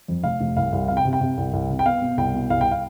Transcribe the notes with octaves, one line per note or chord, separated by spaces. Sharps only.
F2
F1 F5
F1
C2 F5
C2
C3 F5
G5
C3
G5
C3
C2
C2
C3
G5
B3 F5
B2
C2 G5
B2
C2 F5
G5
F5